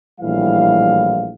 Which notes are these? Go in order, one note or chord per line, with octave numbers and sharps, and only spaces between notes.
A#1 A2 E3 G3 F5